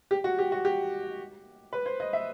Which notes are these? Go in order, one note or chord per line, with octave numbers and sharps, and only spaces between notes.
G4
F#4
G4
F#4
G4
B4
C5
D#5
E5